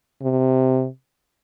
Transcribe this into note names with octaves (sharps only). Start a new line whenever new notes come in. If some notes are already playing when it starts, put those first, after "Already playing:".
C3